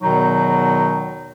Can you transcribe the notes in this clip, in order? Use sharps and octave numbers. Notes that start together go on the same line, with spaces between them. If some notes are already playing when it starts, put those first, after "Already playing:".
E2 B2 D#3 F#3 D#4